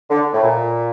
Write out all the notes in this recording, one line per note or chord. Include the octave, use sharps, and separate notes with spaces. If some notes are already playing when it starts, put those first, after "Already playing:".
D3
A2
A#2